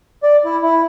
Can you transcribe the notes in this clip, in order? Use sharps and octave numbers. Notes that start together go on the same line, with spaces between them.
D5
E4
E4